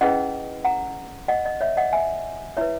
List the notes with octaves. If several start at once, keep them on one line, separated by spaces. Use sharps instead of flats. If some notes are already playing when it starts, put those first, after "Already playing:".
C#4 E4 G#4 B4 D#5 F#5
F#5 A#5
D#5 F#5
D#5
C#5 E5
D#5 F#5
E5 G#5
E4 B4 C#5 E5